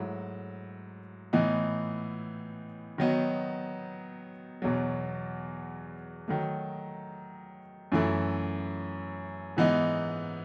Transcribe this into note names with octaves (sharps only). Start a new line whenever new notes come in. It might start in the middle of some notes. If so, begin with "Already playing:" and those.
Already playing: G#2 F#3 A3 E4
A2 E3 B3 D#4
D#3 F#3 B3 D#4
E2 B2 F#3
D#3 F#3 A3
F#2 E3 A3 E4
G#2 E3 B3 D#4